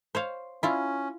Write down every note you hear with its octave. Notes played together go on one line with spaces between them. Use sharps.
C5 C#5 F5
C#4 E4 F4